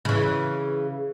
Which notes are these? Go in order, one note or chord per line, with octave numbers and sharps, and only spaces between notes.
C#3 E3